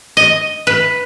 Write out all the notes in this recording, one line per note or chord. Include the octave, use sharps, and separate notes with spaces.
D#5
B4